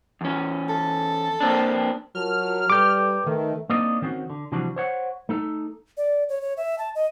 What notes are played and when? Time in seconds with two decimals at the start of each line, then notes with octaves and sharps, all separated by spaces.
0.21 E2 C#4
0.69 A4
1.40 A#3 C4 D4
2.15 F#3 F4 A#4 A5 F6
2.70 G3 A4 B4 G5 D6 G6
3.26 D#3 A3
3.70 A#3 C4 D4 D#4 D5 D#5
4.02 D#3 C4 C#4 F#4
4.30 D3
4.52 C3 E3 F3 G3 D4 F#4
4.76 C5 C#5 F#5
5.29 A3 D#4 A4
5.97 D5
6.29 C#5
6.41 C#5
6.57 E5
6.78 A5
6.95 D#5